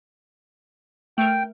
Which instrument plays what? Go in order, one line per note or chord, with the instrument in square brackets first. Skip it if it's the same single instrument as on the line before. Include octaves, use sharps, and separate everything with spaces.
[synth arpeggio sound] A3 A#4 [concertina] G5